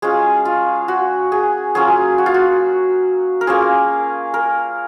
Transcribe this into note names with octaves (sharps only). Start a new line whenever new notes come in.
G#3 C#4 F4 G#4
F4
F#4
G#4
F#3 A#3 C#4 F4 G#4
F#4
F4
F#4
A#4
A#3 C#4 F4 G#4
A#4